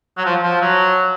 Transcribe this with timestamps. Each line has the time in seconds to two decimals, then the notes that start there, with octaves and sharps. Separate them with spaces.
0.17 F#3
0.26 F3
0.43 F3
0.61 F#3